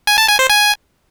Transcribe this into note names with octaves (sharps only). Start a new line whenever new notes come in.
G#5
A5
G#5
C5
G#5